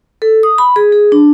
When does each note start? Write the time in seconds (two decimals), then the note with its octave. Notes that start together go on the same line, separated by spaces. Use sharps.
0.22 A4
0.43 D#6
0.58 B5
0.76 G#4
0.92 G#4
1.12 D4